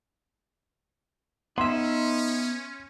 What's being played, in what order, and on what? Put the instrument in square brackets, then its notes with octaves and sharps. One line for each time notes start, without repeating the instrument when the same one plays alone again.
[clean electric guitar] B3 E5 [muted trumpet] C#4 [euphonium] D#4 [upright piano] C6